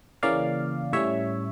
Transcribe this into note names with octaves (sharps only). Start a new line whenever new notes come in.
C#3 E3 A#3 C#4 D5 F5
A2 G3 C#4 C#5 E5